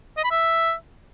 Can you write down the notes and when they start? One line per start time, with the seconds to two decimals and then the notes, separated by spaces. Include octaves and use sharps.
0.17 D#5
0.24 B5
0.31 E5